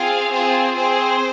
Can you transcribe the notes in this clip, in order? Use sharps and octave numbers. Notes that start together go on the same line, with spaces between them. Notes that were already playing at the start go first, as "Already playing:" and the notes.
Already playing: C4 F4 G#4 F5
C4 F4 G#4 C5
C4 G#4 C5